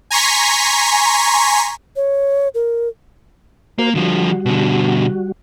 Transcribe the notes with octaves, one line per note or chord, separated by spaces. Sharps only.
G#5 A#5 C6 C#6 B6
C#5
A#4
A#3 F#4 A#4 C5
D3 F3 G3 F#4
B2 D3